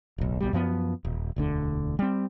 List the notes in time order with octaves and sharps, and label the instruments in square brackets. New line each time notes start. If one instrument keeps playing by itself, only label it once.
[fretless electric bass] D1 B1
B1 B2 G3
F#2 F3 B3
D#1
E1 D2 D3
G3 C4